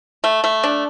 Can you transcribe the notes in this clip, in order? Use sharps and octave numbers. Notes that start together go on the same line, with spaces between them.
A3
A3
D4